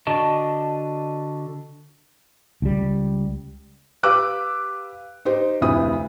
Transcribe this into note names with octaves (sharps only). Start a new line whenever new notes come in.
D3 F#4 D5 D#5 G5 A5
C#2 G3
G4 B4 F5 D6 E6 F#6
D#4 G4 C5
F1 D2 C3 E4 D#6